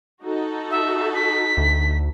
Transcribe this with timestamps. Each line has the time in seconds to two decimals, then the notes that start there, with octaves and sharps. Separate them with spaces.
0.22 D#4 F#4 A4
0.71 E5
1.14 B6
1.57 D2